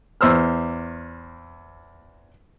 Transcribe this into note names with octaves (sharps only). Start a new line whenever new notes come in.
E2 C5 E6 F6